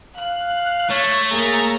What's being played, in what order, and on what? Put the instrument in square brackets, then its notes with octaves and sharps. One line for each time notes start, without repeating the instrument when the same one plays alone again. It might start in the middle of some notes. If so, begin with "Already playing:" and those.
[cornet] F5 [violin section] F#6
[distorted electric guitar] A3 [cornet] C#5
[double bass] A#3 [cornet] G#4 [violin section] C#5 A#5